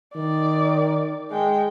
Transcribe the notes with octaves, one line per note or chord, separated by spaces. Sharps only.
D#3 D5
G#3 G5